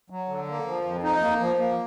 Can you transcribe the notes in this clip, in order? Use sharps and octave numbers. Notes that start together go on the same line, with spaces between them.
F#3
D3
A#3
F3
F2
D#4
A#3
F3
A#3